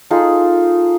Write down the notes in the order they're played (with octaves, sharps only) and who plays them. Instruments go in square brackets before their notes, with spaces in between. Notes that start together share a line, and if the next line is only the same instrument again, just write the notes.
[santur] D#4 F4 G#4 A4